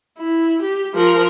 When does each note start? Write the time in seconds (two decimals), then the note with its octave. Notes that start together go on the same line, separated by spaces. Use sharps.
0.18 E4
0.63 G4
0.94 F3 A#4